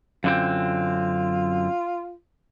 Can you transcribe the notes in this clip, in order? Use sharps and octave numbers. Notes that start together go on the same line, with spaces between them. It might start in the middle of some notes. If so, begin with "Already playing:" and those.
F#2 D3 C4 F4